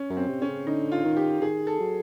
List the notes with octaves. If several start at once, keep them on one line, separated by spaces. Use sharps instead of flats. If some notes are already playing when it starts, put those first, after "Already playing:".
Already playing: C#4
F#2
C4
C3
C#4
C#3
D3 D#4
F4
D#3
G4
D#3 G#4
A4
F#3